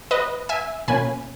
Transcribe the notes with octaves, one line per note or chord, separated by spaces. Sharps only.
B4 D#5
E5 G#5
B2 A#3 C#4 G#5 B5